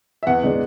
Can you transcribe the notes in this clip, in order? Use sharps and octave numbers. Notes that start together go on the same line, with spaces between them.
E5
E2 F#5
C#3 G#3 D4